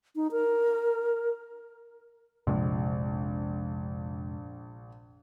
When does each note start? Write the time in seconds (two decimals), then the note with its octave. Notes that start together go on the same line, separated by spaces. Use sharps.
0.16 D#4
0.32 A#4
2.47 A#1 F2 C3 G#3